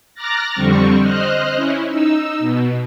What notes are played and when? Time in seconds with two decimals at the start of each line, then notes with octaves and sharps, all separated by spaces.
0.15 A#5 D6 F6 F#6 A6 A#6
0.54 F2 D3 G3 C4 C#6
1.00 C5 D#5 F6 F#6
1.55 C#4 E4
1.87 D#4 E6
2.39 B2